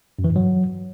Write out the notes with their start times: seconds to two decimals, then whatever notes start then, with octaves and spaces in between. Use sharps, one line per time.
0.19 F#2
0.24 E3
0.30 G2
0.36 F#3